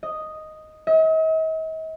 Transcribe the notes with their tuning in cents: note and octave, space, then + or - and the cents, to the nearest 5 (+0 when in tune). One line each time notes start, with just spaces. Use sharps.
D#5 +0
D#5 +45